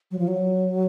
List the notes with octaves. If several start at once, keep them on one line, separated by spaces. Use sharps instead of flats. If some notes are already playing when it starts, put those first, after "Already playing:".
F#3
F3
F#3